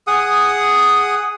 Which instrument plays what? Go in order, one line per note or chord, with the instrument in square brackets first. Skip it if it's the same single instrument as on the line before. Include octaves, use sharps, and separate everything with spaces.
[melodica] G#4 F#5 D#6